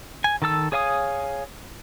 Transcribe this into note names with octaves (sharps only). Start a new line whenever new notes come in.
G#5
D#3 A4 A5 E6
G#4 C#5 F5 G#5 D#6